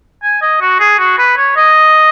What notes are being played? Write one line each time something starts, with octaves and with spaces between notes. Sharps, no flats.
G#5
D#5
F#4
G#4
F#4
B4
C#5
D#5